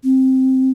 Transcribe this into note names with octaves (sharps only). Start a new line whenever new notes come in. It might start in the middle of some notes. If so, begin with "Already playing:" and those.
C4